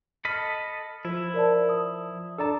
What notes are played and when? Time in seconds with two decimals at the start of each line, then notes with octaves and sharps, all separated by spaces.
0.25 A4 D#5 B5 F6
1.05 F3 E4
1.34 A#4 D5 A5
1.69 D#6
2.38 D4 A4 D5 A5 A#5